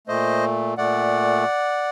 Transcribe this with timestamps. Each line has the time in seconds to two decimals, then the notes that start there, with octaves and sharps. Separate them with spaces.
0.07 A#2 A3 C5 D#5
0.77 A#2 A3 D5 F#5